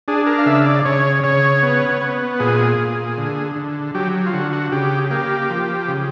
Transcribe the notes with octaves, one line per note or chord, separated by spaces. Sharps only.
D4 G#4
A#4
F5
C#3 E5
D5
C#3 C#5
C#3 C#5
B3
B3
A#2 G#4
A#2
D3
D3
F#3 G4
F4
D3 F#4
F#4
C#3 G4
A#3 G4
F3
C#3